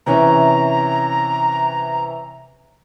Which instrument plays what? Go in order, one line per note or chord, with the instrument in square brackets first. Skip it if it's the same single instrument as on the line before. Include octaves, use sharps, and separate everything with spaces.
[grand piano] C3 E3 C#4 [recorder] A#5